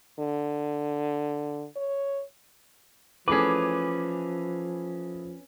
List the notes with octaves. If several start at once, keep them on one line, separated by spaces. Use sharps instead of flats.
D3
C#5
E3 F3 A3 C#4 G#4 B4 D6